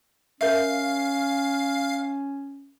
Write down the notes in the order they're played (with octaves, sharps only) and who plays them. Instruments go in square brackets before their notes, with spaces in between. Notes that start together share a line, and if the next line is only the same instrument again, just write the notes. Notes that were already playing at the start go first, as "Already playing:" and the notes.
[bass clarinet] C#4 [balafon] A#4 E5 [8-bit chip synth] F5